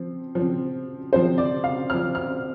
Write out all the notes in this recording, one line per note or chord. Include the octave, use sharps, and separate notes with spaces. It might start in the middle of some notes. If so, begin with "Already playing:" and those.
Already playing: F3 C4
F3 C4
F3 C4 C5
D5
F5
F3 C4 F6
F6